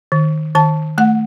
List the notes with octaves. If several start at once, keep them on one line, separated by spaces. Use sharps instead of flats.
D#3
D#3 A5
A3 F#5